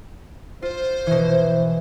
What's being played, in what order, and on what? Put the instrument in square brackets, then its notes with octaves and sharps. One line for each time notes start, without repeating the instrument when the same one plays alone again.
[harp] F4 [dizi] C5
[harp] B2 E3